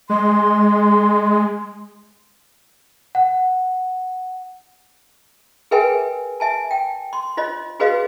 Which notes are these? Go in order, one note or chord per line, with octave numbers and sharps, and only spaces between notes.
G#3 C6
F#5
G#4 A#4 B4 E5 G5 G#5
E5 G#5 A5
G5
C6
F4 C5 D#5
F#4 G#4 B4 C5 D#5 F5